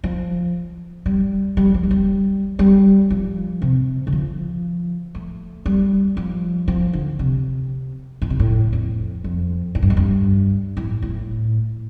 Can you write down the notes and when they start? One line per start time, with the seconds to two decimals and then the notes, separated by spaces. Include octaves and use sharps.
0.04 F3
1.06 G3
1.57 G3
1.74 F3
1.83 A3
1.91 G3
2.59 G3
3.10 F3
3.62 C3
4.07 D3
4.13 F3
5.15 A3
5.66 G3
6.17 F3
6.68 F3
6.93 D3
7.19 C3
8.22 A2
8.30 C3
8.40 A2
8.73 F2
9.24 F2
9.75 A2
9.82 G2
9.90 F2
9.97 G2
10.77 A2
11.02 A2